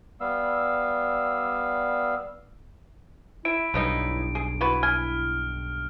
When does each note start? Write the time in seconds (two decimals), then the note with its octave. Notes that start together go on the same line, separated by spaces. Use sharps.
0.20 G3 B3 F5 E6
3.45 E4 E5 D7
3.74 B1 G2 C#3 B3 D#4
4.35 G#4
4.61 B3 E4 F#4 B4
4.83 G#5 F6